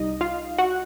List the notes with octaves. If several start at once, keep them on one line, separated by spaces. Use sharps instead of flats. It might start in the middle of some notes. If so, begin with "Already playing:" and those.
Already playing: C2 G3 D#4 D#5
F4 F5
F#4 F#5